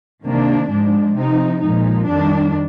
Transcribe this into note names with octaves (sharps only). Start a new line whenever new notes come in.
C3 D#3 A#3 D4
G#2 F3 G#3 D4
C3 F3 C4 D#4
A#2 F3 G#3 D#4
F2 D#3 G3 D4